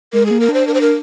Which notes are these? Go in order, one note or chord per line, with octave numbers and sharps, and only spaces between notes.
G#3 A#4
A#3 G#4
A#4
D4 C5
D4 A#4
C5
A#4